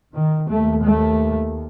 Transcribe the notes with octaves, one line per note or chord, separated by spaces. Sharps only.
D#3
D#2 A3
A3